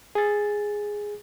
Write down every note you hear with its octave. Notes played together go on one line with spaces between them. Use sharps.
G#4 A6